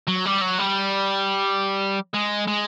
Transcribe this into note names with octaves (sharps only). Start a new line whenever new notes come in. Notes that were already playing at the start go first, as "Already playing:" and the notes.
F#3
G3
F#3
G3
G#3
G#3